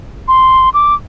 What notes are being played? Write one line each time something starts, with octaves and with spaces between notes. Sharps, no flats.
C6
D6